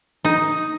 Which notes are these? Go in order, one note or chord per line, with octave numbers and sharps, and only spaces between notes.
D#4